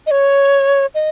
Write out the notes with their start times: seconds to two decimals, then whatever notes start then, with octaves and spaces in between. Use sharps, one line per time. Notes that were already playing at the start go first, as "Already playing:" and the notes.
0.07 D#5
0.11 C#5
0.95 D#5